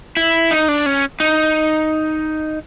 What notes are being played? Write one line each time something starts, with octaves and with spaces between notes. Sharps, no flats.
E4
D#4
D4
C#4
D#4